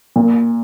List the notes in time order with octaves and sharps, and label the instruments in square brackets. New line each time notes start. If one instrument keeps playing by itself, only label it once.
[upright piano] A#2